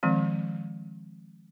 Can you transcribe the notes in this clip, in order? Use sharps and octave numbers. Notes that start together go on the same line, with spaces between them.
D#3 F3 G#3 C4